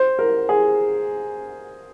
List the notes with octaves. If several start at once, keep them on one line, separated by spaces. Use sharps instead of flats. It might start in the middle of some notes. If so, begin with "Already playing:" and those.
Already playing: C5
A#4
G#4